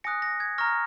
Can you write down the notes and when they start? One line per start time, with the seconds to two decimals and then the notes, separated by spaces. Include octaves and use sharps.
0.04 G#5 D#6 F#6 A#6 C#7
0.22 A#6
0.40 G#6
0.58 A#5 C#6 F6 A#6